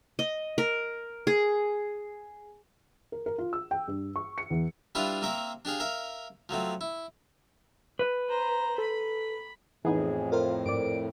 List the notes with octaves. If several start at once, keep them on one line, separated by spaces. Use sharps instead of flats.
D#5
A#4
G#4
A#4
A#4
F4
E6
G5
G2
C#6
C#7
E2
G3 D4 E4 F4 B4 F5
A#3 C4 A#4 E5
D4 G4 G#4 F5
A#4 E5 F5
F3 F#3 A3 C4
E4
B4
C5 A#5
A4 B5
F2 A2 E3 B3 D#4 G#4
F4 A4 A#4 C5
G#2 D5 D7